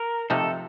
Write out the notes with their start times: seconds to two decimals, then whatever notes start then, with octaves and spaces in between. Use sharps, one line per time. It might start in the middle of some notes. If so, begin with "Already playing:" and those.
Already playing: A#4
0.30 C3 F3 A3 D#4 A4